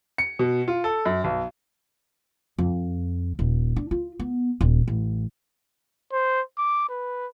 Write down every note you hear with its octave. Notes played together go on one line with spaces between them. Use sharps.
C#7
B2
F4
A4
F#2
B1
F2
D#1
D4
F4
B3
D#1
A1
C5
D6
B4